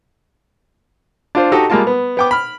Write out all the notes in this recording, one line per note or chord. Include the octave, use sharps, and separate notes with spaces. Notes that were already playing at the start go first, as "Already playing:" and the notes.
D4 F4 C5
D#4 F#4 G4 A4 D#5
G3 G#3 A#3 F4 A5
B3
B3 G5 D6
B5 F6